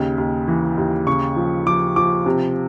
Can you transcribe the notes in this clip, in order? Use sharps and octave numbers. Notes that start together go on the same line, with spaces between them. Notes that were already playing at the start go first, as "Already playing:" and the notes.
Already playing: D#2 C#3
D#2
E3
D#2
C#3 C#6
F3
F3 D6
F3 D6
C3